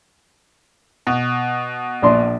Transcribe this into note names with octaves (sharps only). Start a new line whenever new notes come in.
B2
A#1 D4 C6